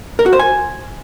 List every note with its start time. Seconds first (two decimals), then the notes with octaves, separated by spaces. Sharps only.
0.19 A#4
0.26 F#4
0.33 C5
0.39 G#5